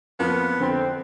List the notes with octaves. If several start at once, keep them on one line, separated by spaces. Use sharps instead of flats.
F2 F3 A#3 B3
F2 D3 C4 G5